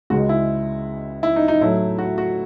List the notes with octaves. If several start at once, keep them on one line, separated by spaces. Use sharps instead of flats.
C#2 C#3 G#3 F#4
E4
E4
D#4
D#4
A2 F#3 A3 E4
F#4
F#4